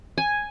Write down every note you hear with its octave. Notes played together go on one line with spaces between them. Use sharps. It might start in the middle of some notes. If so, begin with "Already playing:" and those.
G#5